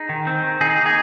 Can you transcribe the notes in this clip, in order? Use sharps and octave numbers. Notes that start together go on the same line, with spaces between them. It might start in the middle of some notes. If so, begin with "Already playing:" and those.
Already playing: D#4 G#4
D#3
C4
D#3
D#3 D#4 G#4
A#3
D#4 G#4